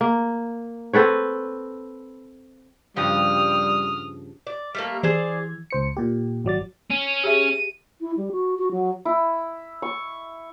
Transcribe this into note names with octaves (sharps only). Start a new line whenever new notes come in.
A#3
C4 A4 B4 C#5
G2 C#3 F3 G3 D#6 F6
D5
G3 A3 A#3
E3 G#4 C5 D5 G#6
C#2 C5 C#7
A#2 G4
G#1 F#3 D5 A6
C#4
G4 G#4 E5 D#7
E4
G3
F#4
F#4
F#3
E4
C#6